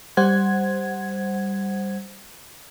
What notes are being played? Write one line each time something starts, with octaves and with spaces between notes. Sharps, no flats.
G3 C5 F#5 G#6